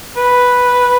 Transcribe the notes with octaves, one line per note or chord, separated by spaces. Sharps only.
B4